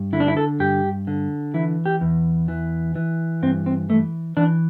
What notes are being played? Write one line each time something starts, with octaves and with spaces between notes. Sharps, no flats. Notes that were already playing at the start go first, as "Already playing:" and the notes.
Already playing: G2
D3 E4
D4
E4
A4
G2 G4
D3
E3 E4
G4
E2
E3
E3
G2 C4
C4
E3 A3
E3 D4